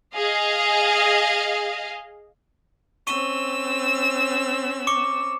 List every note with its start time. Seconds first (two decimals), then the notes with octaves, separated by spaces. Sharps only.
0.15 G#4 D#5 F5
3.07 C4 C#4 C#6 E6 D#7 G7
4.87 C#6 D6 C#7